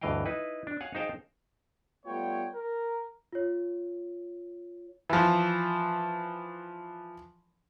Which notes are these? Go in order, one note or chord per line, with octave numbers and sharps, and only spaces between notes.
D2 G2 E3 D#5 F5 G5
D#4 E4 B4
D4
C#5 F5 F#5 G#5
D#4 G#4 C5 F5 G5 A5
G3 A3 B3 F4 C#5 G5
A#4
F4 C#5
E3 F3